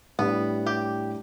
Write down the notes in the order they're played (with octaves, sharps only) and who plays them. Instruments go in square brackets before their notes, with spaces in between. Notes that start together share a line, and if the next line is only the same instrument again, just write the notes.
[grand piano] A2 G3 D4 [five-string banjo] B3
[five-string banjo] G4